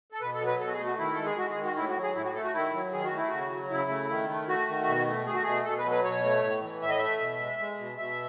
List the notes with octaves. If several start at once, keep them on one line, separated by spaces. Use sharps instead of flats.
A4
B2 B4
A4
F#3
B4
B2 A4
F#4
G#4
A3
F#4
D#3 E4
G#3 A4
G#4
G#3 F#4
G#4
D#3
F#4
A2 E4
F#4
F#3
G#4
A2 E4
F#4
A3 A4
F#4
D#3 E4
F#3
D#3 G#4
F#4
A3 E4
C#3 F#4
F#3
C#3 E4
A3
D#3
A3
A3 F#4
D#3
B2
A3
A3 G#4
F#4
B2 G#4
B2 A4
B4
F#3
B4
B2 C#5
A3
A2
E3
A2 E5
D#5
A3 E5
B2
G#3
G#3
B2
B2 E5